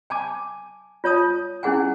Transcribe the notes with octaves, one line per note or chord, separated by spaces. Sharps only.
G#5 A5 D6
F4 C#5 A5 D#6
C#4 E4 G#4 F#5 G#5